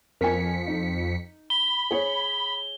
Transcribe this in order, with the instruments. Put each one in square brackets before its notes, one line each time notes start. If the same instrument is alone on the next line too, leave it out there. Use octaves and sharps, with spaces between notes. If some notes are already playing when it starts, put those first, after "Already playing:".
[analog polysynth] F2 B6 C#7 [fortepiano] A#4 G#5
[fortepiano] D#4
[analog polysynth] B5 [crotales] G7
[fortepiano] G#4 C#5